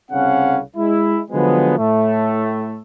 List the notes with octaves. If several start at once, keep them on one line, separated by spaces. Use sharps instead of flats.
C2 C#3 C4 C#4 F5 F#5
G#3 E4
D3 F3 F#3 G#3 B3
A2 A3